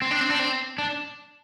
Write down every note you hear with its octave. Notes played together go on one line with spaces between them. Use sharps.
C4
D4
C4
D4
C4
D4